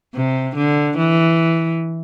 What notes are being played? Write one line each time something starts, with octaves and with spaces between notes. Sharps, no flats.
C3
D3
E3